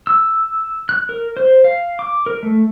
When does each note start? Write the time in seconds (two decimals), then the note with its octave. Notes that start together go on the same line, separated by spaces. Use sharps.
0.07 E6
0.89 F#6
1.09 A#4
1.37 C5
1.64 F5
1.99 D6
2.26 A#4
2.43 A3